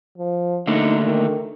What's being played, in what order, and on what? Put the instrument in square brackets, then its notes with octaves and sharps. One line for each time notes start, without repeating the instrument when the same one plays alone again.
[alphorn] F3
[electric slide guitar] D3 A3 A#3 [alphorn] D#4
[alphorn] D#3